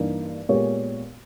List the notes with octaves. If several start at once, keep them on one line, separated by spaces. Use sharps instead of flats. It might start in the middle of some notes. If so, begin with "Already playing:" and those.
Already playing: G2 E3 A#3 D#4
A#2 G#3 B3 G4 C#5